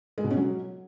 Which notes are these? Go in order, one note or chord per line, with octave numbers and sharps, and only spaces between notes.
G#3
B2
C#4
F#3